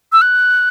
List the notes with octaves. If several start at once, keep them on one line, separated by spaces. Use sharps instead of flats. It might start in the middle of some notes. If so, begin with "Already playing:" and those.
E6
F#6